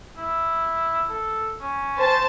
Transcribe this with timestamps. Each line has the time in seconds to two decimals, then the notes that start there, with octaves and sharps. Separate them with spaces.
0.17 E4
1.09 A4
1.61 C#4
1.97 C5 A5